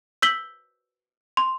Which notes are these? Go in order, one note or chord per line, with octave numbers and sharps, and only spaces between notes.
E6 G6 B6 F#7 G7
C6